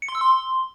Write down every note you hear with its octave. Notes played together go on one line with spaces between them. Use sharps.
C#7
C6
E6
C6